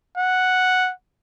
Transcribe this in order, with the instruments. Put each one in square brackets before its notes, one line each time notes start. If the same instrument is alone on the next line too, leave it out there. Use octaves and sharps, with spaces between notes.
[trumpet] F#5